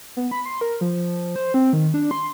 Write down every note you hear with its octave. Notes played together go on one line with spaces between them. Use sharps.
B3
B5
C6
A#4
F3
C5
C4
D#3
D4
C6